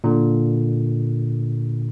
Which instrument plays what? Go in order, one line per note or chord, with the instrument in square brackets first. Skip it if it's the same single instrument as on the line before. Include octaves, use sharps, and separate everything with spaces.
[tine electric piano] A#2 D3